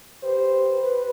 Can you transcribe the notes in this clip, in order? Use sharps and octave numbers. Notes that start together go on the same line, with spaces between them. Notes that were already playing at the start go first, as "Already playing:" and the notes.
G4 B4 C5
B4